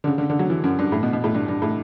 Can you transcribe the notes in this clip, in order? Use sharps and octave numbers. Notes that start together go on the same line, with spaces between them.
D3
C#3
D3
D3
F#3
E3
F#2
G2
A2
B2
B2
A2
G2
G2
A2